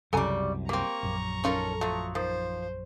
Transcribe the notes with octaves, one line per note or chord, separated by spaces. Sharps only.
C2 F#2 C#3 G3 A4 G#5 A#5
G3 A#3 C4 A#5 C#6
A#1 F#2
C#4 D#4 F4 A4 A#4
F3 F#3 A3
D#3 F3 C5